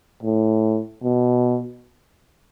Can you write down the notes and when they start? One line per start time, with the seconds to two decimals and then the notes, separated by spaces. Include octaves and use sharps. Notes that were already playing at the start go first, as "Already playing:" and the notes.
0.23 A2
1.03 B2